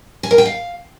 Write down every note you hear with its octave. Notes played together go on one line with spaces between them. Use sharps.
G#5
A#4
G5
F5